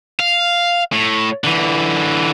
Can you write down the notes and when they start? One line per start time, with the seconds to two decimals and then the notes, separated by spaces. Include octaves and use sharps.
0.19 F5
0.92 A2
1.44 D3 E3